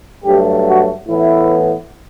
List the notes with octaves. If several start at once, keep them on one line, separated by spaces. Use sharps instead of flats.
G2 F#3 A3 G4
F#4
A2 E3 B3 E4